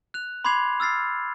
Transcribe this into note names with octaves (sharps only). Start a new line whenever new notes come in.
F#6 F7
B5 C6 D6 G#6 C7 F7
E6 F6 A6 C7